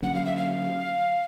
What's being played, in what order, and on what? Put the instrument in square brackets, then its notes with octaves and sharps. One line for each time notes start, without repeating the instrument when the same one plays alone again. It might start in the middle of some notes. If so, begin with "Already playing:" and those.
[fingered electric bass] D3 F#3 A#3 C#4 [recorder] F#5
[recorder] F5
E5
F5